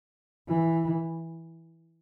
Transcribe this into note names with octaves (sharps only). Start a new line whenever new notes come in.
E3